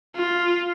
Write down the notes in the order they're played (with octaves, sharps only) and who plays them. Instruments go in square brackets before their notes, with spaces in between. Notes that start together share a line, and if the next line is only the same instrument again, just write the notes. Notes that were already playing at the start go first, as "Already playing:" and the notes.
[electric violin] F4